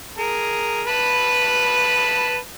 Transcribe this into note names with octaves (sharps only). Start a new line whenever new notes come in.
G#4 A#4
B4 A5 B5